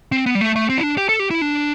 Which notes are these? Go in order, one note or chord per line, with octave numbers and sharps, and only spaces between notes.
C4
B3
G3
A3
A3
C4
E4
D4
G4
A4
G4
E4
D4